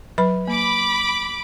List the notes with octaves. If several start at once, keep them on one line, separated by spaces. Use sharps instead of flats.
F#3 B4 B5
A#3 B5 D6